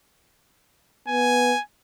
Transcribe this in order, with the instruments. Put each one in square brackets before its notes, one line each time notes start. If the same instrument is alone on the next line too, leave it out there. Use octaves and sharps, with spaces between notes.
[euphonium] B3 [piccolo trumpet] G#5